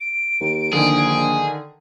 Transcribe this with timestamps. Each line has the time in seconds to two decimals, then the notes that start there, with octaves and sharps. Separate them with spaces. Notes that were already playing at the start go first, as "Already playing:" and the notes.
0.01 D7
0.40 D#2
0.73 A#1 D3 D#3 G#4